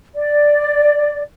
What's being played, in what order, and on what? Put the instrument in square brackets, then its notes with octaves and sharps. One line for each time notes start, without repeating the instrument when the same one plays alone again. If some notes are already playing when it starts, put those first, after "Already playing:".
[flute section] D5